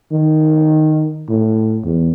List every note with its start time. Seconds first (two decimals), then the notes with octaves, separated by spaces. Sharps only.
0.12 D#3
1.29 A2
1.84 E2